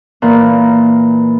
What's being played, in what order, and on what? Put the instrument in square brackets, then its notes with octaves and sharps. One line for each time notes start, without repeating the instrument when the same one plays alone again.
[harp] A#2 E3 A#3